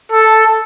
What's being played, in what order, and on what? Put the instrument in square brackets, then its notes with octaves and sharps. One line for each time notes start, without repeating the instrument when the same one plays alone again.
[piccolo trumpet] A4